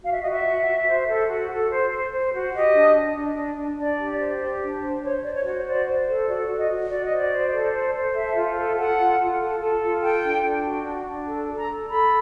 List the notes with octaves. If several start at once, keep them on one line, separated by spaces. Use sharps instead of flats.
F#4 F5
E5
F#4 D#5
E5
F#4
F#4
C5
A4
F#4
A4
C5
C5
C5
F#4
G4 D#5
D4
D4
D4
D4
D4
D4 D5
G4
C5
G4
D4
C5
C5 C#5
C5 D5
C#5
F#4
C5 D5
C5
A4
F#4 D5
F#4
D#5
F#4
F#4 D5
D#5
C5 D5
C5
A4
C5
C5
A4 E5
F4
A4
A4 F#5
F4
F4
A4
A4
F4
A4 G5
D4
D4
F#4
D4
D4
A4
A4
A#5
A4
A4 B5